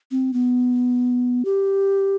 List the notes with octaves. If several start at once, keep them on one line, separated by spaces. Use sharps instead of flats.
C4
B3
G4